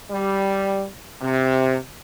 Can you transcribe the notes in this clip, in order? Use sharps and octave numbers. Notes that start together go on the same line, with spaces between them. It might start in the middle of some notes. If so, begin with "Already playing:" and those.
G3
C3